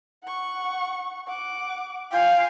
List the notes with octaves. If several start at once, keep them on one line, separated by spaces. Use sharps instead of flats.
F#5 C#6
F#5 D6
F4 F5 G5 G#5